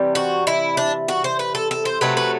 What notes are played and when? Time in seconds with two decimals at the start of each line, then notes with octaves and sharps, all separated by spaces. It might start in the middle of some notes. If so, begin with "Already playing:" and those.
Already playing: C3 E3 G3
0.15 F#4
0.47 E4
0.77 D4
1.08 F#4
1.24 C5
1.39 B4
1.55 A4
1.71 A4
1.85 C5
2.01 C3 F#3 A3 B4
2.17 B4